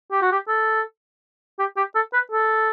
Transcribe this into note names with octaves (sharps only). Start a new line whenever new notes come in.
G4
F#4
G4
A4
G4
G4
A4
B4
A4